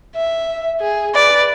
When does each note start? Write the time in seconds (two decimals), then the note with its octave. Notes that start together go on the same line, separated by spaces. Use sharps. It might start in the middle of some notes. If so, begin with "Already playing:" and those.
0.16 E5
0.80 G#4
1.14 B4 D5